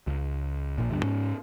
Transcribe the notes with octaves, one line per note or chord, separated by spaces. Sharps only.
C#2
A#1 A#2
D2 G2
G#2 C#4